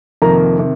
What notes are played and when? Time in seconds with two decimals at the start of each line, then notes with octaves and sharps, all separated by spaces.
0.22 F2 C3 D#3 A#3 A#5
0.59 C3 D#3